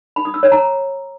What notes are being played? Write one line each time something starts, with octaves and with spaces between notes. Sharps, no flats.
B5
D#6
E6
C#5
A#5